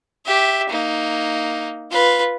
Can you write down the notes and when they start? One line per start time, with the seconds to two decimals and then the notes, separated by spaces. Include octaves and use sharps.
0.25 G4 E5
0.70 A#3 D#4
1.91 F4 B4